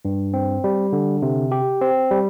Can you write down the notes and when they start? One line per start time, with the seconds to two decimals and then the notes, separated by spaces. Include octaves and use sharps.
0.05 G2
0.34 C4
0.64 G3
0.93 D3
1.22 C3
1.52 G4
1.81 C4
2.11 G3